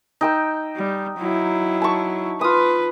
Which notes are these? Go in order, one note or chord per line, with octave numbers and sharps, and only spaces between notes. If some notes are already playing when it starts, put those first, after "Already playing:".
D#4 G5 E6
G3
F#3 E4
A5 C#6
F4 B4 D#6